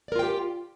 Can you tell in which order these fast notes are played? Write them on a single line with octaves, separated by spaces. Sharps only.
D5 A#4 F4 G5 G4